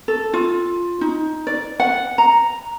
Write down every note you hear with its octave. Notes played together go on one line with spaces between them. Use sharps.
A4
F4
D#4
D5
F#5
A#5